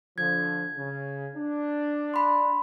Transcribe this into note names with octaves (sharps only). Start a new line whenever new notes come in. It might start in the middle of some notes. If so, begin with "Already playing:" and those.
D3 F3 G#6
C#3
D4
B5 C6